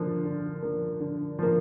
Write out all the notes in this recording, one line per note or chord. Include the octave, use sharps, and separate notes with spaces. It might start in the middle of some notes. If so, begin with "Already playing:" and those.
Already playing: D3 F3 A#3
D3
F3 A#3
D3
F3 A#3